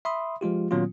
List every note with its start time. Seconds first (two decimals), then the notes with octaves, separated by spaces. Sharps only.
0.05 E5 B5 C6 D#6
0.41 F3 G#3 F4 G4
0.71 A#2 D#3 F#3 B3 C#4 F4